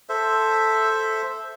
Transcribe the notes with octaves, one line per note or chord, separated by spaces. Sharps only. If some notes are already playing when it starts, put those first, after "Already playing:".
A4 C5 E5